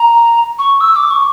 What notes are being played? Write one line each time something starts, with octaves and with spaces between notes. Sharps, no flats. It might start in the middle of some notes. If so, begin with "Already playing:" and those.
Already playing: A#5
C#6
E6
D6
C#6